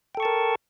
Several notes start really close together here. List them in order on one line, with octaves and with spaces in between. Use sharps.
G5 A4 C#6 A5 A#4